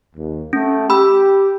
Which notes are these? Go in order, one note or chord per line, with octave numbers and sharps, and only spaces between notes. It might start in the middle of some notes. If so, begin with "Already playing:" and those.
D#2
A3 C#4
G4 B5 E6